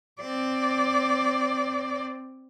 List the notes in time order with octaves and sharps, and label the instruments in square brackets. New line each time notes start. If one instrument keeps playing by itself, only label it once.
[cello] C4 D5